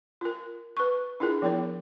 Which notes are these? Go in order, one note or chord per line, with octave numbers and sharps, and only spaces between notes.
F4 A#4
B4 C#6
D4 E4 F4 G#4 A#4
F3 B3 E4 A#4 C#5